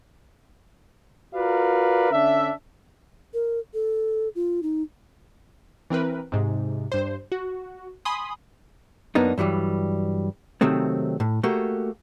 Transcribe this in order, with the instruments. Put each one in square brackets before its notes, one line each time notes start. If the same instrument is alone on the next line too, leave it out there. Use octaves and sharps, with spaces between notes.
[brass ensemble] F4 F#4 A#4 B4 D5 F5
D3 C#4 D4 E5
[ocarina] A#4
A4
F4
D#4
[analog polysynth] E3 C4 A#4 B4
G#2 C3
G2 C5
F#4
G#5 B5 C6 D#6
[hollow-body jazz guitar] F#2 A#3 B3 D4 D#4
G2 E3 F#3 G3
C3 D#3 F#3 A3 C4
A2
A3 A#3 F#4 G4